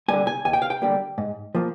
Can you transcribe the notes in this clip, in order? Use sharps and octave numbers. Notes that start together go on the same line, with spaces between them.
D3 G3 A#3 G#5
G#5
D#2 G#5
G5
F5
G5
D3 G3 A#3
G#2
F3 A#3